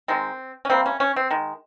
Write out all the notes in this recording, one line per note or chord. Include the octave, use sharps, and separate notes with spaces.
D#3 G#3 C4
C#4
C3 G3 A#3 C4
C#4
C#4
C4
D#3 G#3